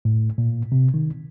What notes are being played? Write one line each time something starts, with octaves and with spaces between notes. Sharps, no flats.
A2
A#2
C3
D#3